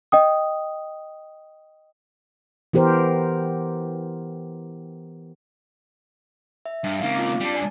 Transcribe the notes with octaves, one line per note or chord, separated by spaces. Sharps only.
D#5 G5 D#6
E3 B3 G4 A#4 C5
E5
G2
C#2 A#3 C4 D#4 F5
F4 D6
G3 D4
D5 G#5 A5